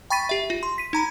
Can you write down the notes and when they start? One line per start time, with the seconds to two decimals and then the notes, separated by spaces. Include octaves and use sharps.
0.10 G5 B5 C#6 A6 B6 D#7
0.29 G4 E5
0.50 F4
0.63 C6
0.78 B6 D#7
0.93 D#4 A#5 B5